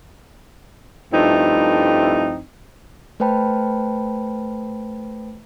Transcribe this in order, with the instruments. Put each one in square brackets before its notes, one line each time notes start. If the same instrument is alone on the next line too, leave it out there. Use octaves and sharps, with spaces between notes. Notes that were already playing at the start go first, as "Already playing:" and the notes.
[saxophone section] G2 F3 A3 C4 D#4 E4
[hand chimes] A3 B4 C5 G5 A5 B5